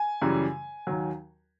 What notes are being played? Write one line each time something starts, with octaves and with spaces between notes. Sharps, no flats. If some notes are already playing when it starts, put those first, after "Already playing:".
Already playing: G#5
F#2 C#3 E3 G3
D#2 D#3 F#3